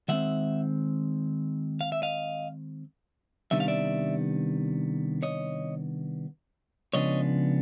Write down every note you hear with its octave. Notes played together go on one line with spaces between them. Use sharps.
D#3 G#3 C4 E5 F#5
F5
E5
D#5 F5
C3 D#3 G3 B3 D4 E5
F5
D5 E5
C#5 D#5
C#3 F3 G#3 B3 D4 C#5 D#5